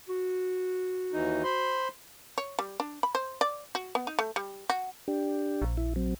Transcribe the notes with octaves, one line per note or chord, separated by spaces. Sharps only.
F#4
D#2 E3 D#4
C5 B5 C6
C#5
G3
D4
B5
C5
D5
F#4
B3
D#4
A3
G3
F#4
D4 G4
A#1
E4
F#3 C4